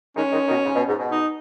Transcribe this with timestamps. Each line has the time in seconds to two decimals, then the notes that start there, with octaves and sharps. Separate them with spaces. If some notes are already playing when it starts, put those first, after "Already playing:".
0.16 D#3 G#3 C#4
0.32 D#3 G#3
0.48 B2 D#3
0.64 G#2 C#3
0.75 B2
0.88 G#2
0.99 B2
1.11 D#4